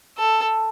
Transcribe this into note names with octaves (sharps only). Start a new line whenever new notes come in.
A4